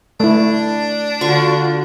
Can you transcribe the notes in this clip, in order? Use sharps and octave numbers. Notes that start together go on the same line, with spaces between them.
A3 D4 E4
D3 F4 F#4 C#6